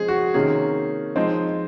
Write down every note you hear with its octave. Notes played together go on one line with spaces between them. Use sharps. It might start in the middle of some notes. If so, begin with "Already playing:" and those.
Already playing: F3 G#3 C4 G#4
F#4
C3 D#3 A#3 C#4 G#4
F3 G#3 C4 D#4